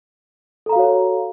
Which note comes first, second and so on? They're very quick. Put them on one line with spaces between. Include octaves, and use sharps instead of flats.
A4 A#5 F5 F#4 C#5